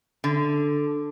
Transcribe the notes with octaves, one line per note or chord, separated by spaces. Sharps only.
D3